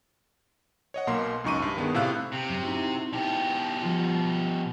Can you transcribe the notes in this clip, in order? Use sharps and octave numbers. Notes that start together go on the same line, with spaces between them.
C#5 D#5 F#5
B1 B2 A#3 A#4 C6
C#2 F#2 D#4 C#6 D6 D#7
G2
D#3 B3 D4 G#4
A2 C3 E4 F5 E6 F#6
C3
F#2
D#4 E4 F#4
B2 G4
F3 G3 F4